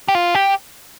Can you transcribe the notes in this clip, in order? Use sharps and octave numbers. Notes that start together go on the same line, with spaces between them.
G4
F4
G4